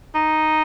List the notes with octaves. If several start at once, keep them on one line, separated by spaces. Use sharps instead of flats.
D#4